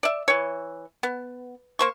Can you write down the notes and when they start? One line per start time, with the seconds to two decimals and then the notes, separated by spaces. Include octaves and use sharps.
0.03 D5 E5
0.28 E3 C#5
1.03 B3
1.79 A#3 C5 C#6